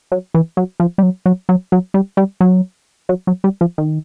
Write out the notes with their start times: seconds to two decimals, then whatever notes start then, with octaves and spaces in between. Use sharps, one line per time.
0.12 F#3
0.34 E3
0.57 F#3
0.80 F3
0.98 G3
1.03 F#3
1.26 F#3
1.49 F#3
1.72 F#3
1.94 G3
2.17 G3
2.41 F#3
3.09 F#3
3.27 F#3
3.44 G3
3.61 F3
3.78 D#3